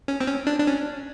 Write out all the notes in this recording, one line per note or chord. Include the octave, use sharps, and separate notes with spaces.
C#4
C4
C#4
D4
D4
C#4